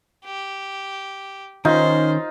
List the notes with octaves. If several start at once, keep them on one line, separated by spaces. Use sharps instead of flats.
G4
D#3 C#4 D#4 F4 C5